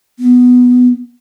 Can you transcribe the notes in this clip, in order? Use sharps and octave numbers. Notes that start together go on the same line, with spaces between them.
B3